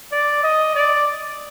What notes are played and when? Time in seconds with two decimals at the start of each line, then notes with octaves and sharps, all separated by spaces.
0.12 D5
0.43 D#5
0.75 D5